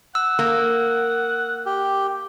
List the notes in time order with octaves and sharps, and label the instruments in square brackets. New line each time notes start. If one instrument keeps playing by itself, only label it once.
[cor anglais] F#5 [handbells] E6
[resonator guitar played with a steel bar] A#3
[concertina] G4